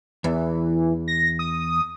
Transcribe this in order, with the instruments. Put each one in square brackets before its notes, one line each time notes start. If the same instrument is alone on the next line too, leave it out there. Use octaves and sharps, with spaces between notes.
[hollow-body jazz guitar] E2 [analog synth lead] E3
[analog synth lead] A#6
D#6